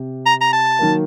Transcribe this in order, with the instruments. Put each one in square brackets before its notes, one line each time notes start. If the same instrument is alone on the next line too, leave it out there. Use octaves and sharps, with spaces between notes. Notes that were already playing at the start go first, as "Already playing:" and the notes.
Already playing: [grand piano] C3
[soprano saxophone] A#5
A#5
A5
[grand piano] D#3 F#3 A#3